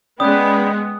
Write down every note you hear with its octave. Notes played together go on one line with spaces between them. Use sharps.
G#3 B3 C#4 B4 D5 G5 D#6 F#6